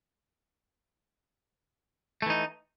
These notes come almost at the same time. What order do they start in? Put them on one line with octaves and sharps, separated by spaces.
A3 E3 D#4